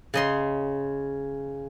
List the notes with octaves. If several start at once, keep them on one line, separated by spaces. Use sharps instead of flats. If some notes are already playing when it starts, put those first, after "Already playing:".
C#3 D#5 C6